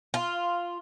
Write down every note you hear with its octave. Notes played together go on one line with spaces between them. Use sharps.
F4